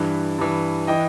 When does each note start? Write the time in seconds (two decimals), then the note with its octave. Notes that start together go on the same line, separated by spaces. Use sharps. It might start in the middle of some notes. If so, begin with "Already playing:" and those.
Already playing: G2 E3
0.38 G2 E3
0.87 E3 D#5 G5